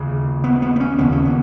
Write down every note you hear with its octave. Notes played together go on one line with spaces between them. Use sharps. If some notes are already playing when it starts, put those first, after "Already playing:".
Already playing: D#2 C#3
B3
B3
B3
C#4
D#2 C#3 B3
C#4
B3